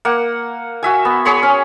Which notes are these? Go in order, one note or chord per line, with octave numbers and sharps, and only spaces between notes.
A#3 F#5
F#4 E5 G#5
B3
G#4 C#5 B5 C6
C#4